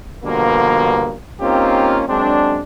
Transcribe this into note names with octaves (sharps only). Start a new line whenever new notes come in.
G2 B2 D3 F3 A#3
A#3 C4 C#4 D#4 F4 G4
F#2 G#3 C4 D4